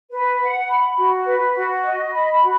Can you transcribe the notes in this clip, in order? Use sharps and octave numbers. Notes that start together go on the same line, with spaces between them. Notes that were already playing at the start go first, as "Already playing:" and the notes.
B4
F#5
B5
F#4
B4
F#4
D#5
B5
F#4